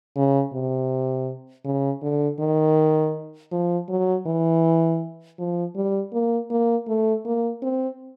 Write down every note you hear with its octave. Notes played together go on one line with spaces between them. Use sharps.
C#3
C3
C#3
D3
D#3
F3
F#3
E3
F3
G3
A#3
A#3
A3
A#3
C4